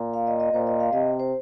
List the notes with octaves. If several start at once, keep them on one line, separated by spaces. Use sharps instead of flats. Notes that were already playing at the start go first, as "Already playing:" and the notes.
Already playing: A#2
F5
D#5
D#5
A#2 C5
D#5
F5
C3 D#5
C5